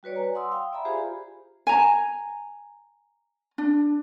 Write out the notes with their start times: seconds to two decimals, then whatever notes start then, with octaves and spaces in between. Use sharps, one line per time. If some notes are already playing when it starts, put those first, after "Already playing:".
0.03 G3 F#4 B4 C#5 D5
0.16 G#5 A#5
0.35 F#5 C6 D#6 E6
0.52 F5 G5
0.72 D5 E5 G#5 A#5 B5
0.85 F4 G4 G#4 C5 F5
1.67 G#5 A#5
3.58 D4